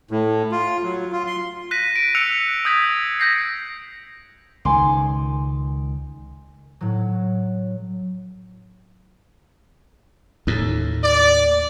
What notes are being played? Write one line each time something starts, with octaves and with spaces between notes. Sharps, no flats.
A2
F4
F#3
F4
C6
F#6 A#6 B6 D#7
D7 D#7
E6 F#6 C#7 F7
D#6 G6 G#6 B6
G6 A#6 C7
C#2 D#3 G#5 C6 D6
A2 F#3
D#2 A2
D5